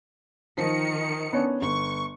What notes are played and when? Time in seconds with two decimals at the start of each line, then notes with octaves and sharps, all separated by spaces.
0.58 D#3 F3 C#7
1.33 B3 C#4 D4
1.62 G1 C#6